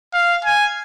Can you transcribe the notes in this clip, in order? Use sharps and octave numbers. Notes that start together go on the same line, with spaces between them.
F5
G#5